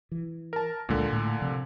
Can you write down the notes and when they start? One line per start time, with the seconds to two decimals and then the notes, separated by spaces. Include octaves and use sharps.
0.12 E3
0.53 A#4 A5
0.89 C#2 A#2 D3 G#3
1.13 A2 A3
1.41 C3 F3